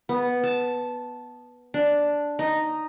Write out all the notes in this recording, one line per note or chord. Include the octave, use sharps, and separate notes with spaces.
B3
A5
D4
D#4